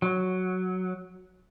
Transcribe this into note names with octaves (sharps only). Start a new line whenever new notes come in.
F#3